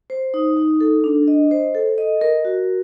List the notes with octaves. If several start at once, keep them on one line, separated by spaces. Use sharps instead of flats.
C5
D#4
D#4
A4
D4
D#5
C5
A4
D#5
A#4
F#4